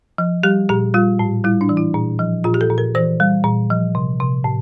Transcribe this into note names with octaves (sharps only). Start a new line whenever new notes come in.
F3
G3 G4
A#2 G4
G3 F4
A2
G3 E4
D4
E3
E4
A#2
F3
A#2 F4
G4
A4
A#2
A#4
E3 C5
G3
A#2
F3
C3
C3
A2